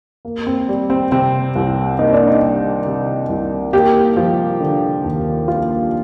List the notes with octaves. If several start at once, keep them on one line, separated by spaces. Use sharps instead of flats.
A#3
C4
G3
C4
C3 C4
C2
A#3 D#4
D4
D#4
G3
C3
C2
A#3 G4
F3
D3
D#2
A#3 F4